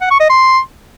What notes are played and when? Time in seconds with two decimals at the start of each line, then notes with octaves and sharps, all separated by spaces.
0.01 F#5
0.11 C#6
0.20 D#5
0.29 C6